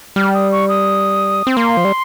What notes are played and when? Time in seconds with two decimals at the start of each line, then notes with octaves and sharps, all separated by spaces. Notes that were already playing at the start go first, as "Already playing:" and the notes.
0.16 G3 F6
0.34 D#6
0.52 C#6
0.69 D#6
1.47 C4
1.57 A#3 C6
1.77 F3
1.84 G3